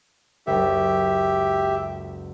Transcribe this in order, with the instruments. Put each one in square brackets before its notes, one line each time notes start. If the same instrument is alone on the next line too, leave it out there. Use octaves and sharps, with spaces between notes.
[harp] F#1 C#2 [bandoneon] G4 E5